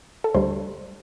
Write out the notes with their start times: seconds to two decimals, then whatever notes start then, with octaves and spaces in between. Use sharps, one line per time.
0.24 A4
0.35 D2 D3 G3 C5